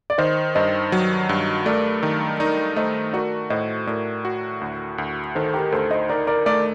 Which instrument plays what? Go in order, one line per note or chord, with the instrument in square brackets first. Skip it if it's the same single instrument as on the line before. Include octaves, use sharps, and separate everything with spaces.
[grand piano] D5
[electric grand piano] D#3 [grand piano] C5 D#5
[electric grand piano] G2 [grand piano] C5 D#5
[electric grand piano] F#3
G2
[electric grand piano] A3 [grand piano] A#4 D5
[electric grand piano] D#3
[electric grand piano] D#4 [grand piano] A#4 D5
[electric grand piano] A3 [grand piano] C5 D#5
[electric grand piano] F#4 [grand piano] A#4 D5
[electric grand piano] A2 [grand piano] C5 D#5
[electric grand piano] A2 [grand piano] A#4 D5
[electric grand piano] F#4
D2
D2
[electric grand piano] D#3 [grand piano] A4 C5
[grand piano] G4 A#4
[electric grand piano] D2 [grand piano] A4 C5
[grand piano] C5 D#5
[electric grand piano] D#4 [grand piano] A#4 D5
[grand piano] A#4 D5
[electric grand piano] A3 [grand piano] A#4 D5